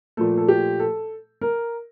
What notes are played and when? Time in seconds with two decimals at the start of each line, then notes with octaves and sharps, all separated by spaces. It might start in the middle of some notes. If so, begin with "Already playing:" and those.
0.17 A#2 F3 A3 A4
0.37 A4
0.48 G4
0.80 A4
1.41 A#4